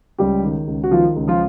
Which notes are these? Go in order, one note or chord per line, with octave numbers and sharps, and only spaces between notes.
C#2 G3 G4
D#3
C#2
F#4
D#3 F3 F4
C#2
F3 F4